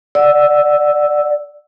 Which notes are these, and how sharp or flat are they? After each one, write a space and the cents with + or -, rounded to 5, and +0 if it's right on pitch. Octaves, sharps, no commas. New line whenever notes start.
D5 +0 F#5 +0 E6 +0